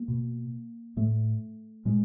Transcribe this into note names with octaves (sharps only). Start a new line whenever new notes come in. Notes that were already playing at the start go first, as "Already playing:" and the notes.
Already playing: A#3
B2
A2 A3
A#2 G#3